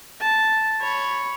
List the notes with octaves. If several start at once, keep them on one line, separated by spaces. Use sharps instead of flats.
A5
C#5 B5